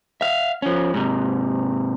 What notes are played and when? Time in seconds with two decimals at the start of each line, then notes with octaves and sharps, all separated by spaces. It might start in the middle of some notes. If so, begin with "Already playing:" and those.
0.21 E5 F5
0.62 F3 C#4
0.94 G#2 C3